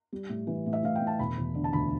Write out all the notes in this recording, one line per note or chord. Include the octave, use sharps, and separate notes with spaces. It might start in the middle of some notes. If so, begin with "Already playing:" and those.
G3
A2
E3
A2
E5
A2 F5
G5
A2
A5
E1 B5
E1
D3
A5
D2 B5